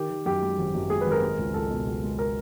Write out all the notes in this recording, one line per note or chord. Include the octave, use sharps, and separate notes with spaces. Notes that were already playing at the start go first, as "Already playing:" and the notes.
Already playing: D#3 G4
D#3
F#2 G4
G#3
G#1
F#2
G#3 G#4
B4
G#1
A#4
G#3
C#2
C#2 A4
B2
C#2
G#3
A#4